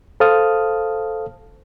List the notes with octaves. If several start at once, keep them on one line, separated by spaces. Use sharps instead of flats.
A4 C5 F5 A5 D#6 F6